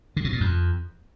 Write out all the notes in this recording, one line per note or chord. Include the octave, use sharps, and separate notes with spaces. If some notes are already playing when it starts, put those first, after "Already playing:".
D3
B2
A#2
F2